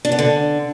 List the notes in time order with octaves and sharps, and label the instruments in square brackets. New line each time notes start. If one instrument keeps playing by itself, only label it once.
[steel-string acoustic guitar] D4
B3
D3